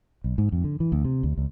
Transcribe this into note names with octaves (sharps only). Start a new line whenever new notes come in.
B1
G#2
F2
D3
E3
D2
C3
D2
C#2